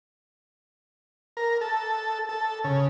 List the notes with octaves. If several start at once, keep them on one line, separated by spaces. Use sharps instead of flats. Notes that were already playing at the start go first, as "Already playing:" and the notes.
A#4
A4
A4
C#3